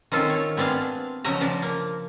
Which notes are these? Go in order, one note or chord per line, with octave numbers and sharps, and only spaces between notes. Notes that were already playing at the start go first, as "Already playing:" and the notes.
D#3 C4 C#4 F4 A4
C#5
B3 C4 D4 G#4 F5
C#3 F3 F#3 D#5 A#5
C#3 F3 D4
A#3